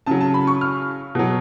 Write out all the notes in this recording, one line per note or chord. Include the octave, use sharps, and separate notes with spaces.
C#3 F#3 A5
A5
B5
C#6
F6
B2 F#3